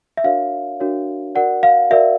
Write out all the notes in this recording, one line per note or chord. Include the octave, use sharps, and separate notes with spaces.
E5
D4 F#4 A#4 C#5 F5
D4 F#4 A#4 C#5
F#4 A#4 D5 F#5
F5
F#4 A#4 D5 E5